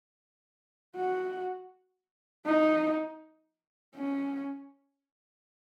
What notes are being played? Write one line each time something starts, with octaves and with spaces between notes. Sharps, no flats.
F#4
D#4
C#4